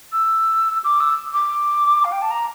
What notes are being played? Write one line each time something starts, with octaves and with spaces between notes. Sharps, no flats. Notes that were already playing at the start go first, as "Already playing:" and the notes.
E6
D6
E6
D6
F5
G5
A5
A#5